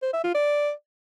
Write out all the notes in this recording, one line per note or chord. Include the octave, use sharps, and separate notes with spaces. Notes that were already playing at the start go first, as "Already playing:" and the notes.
C5
E5
F4
D5